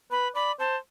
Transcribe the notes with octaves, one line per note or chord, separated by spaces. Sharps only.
B4 B5
D5 B5
C5 A5